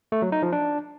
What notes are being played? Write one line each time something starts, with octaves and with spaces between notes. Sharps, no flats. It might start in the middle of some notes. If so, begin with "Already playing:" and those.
A3
F#3
D#4
F3
D4